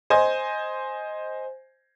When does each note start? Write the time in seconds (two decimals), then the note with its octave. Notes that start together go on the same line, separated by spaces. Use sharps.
0.10 C5 D#5 G#5